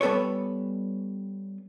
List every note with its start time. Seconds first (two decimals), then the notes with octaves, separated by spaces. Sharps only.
0.01 G3 B3 A4 B4 C#5